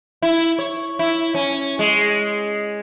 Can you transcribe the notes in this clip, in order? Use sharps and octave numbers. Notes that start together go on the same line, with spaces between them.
E4
C#5
E4
C#4
G#3